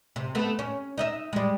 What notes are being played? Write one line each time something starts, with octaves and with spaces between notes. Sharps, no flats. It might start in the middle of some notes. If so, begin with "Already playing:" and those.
C3
A3 B3
C#4
D#4 D#5 E5
G3 G#3